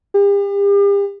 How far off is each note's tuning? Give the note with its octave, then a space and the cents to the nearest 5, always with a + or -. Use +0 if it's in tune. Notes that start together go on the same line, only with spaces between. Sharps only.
G4 +40